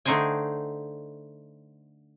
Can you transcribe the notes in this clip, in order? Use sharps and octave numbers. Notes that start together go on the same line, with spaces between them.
D3 A3 D#4 C5 G5 G#5